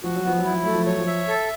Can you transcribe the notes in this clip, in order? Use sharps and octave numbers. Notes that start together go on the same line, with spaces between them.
F3 F#4
F#3
F3 B3
F#3
E4
F3
F#3 A3
F3
F#3 C#5
F3
E5
A4